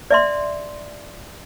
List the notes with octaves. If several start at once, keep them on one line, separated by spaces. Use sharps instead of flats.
D5 E5 C6